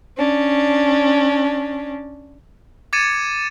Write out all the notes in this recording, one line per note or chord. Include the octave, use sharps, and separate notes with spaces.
C#4 D4
D6 G#6 A6 C#7 D#7 E7